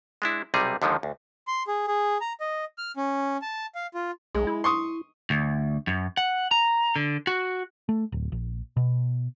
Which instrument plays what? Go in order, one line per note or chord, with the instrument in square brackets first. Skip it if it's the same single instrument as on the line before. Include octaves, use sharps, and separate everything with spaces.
[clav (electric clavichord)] G#3 D4 E4
B1 C3 G3 D#4 G#4
D#2 D3 D#3 F3 G#3
D2
[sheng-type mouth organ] C6
G#4
G#4
A#5
D#5
F6
C#4
A5
F5
F4
[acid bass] B1 [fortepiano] G#3
[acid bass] E4
[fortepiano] C6 C#6 D#6
[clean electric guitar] D2
F#2
F#5
A#5
D3
F#4
[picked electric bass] A3
D1
A#1
B2